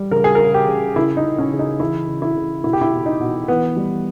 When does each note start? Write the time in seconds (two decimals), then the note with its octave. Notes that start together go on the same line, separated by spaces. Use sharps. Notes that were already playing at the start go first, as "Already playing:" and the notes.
Already playing: G3
0.11 C#3 A#4
0.24 G#4
0.35 A#4
0.39 C#3
0.54 G4
0.68 C#3
0.96 C#3 E4
1.17 D#4
1.24 C#3
1.38 C#4
1.52 C#3
1.59 D#4
1.80 E3 E4
2.08 C#3
2.22 E4
2.36 C#3
2.64 B2 E4
2.73 G4
2.81 E4
2.93 B2
3.06 D#4
3.20 B2
3.48 E3 B3
3.76 G3